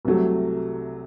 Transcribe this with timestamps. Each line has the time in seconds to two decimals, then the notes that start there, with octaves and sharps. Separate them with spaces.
0.05 C2 C3 F#3 A3